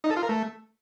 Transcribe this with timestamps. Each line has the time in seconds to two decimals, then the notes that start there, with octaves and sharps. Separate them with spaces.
0.04 D#4
0.10 A4
0.16 F4
0.23 A#4
0.29 A3